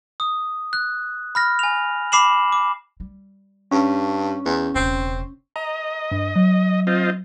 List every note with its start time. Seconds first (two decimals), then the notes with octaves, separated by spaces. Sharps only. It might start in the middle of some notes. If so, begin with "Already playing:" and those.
0.20 D#6
0.73 F#6
1.35 B5 F6 A#6
1.59 G#5 F7
2.12 B5 D6 C7 E7 F#7
2.52 D6
3.00 G3
3.71 G2 C#4
4.45 E2
4.75 E1 C#3 C4
5.56 D#5 A#5
6.12 G2
6.36 F#3
6.87 C4 F4 D#5